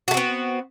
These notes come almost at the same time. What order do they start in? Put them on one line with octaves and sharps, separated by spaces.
F#4 A3 C4 B3